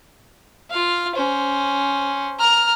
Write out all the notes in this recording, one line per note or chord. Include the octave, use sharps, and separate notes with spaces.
F4 F5
C#4 C5
A#5 F6